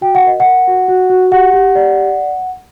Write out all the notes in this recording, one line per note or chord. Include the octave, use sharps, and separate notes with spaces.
F#4 G5
F#5
A#4 D#5
F#5
A#4
F#4
F#4
F#4
G4 F#5
G4
D5